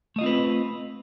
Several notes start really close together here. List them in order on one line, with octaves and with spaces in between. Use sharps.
A3 D#5 F4 C4 B4